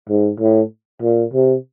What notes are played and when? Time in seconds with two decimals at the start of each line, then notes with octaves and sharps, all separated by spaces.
0.09 G#2
0.40 A2
1.02 A#2
1.33 C3